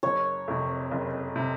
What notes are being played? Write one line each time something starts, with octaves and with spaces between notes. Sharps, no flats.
F#1 C#5
F2 C3
F#1
C3